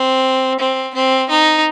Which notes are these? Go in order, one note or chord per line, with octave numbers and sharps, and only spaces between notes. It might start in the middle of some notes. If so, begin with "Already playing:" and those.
Already playing: C4
C4
C4
D#4